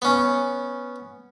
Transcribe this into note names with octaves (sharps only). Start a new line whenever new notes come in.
B3 C#4